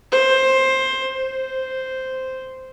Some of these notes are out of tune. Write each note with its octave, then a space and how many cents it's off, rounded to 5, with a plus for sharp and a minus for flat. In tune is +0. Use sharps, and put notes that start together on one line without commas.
C5 +15
C5 -5